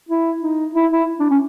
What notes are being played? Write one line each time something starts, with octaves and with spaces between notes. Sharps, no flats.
E4
D#4
E4
E4
D4
C#4